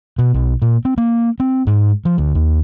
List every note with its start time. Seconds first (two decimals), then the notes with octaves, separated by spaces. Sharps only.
0.18 B2
0.34 B1
0.62 A#2
0.85 C4
0.98 A#3
1.40 C4
1.67 G#2
2.05 F3
2.18 D2
2.35 D#2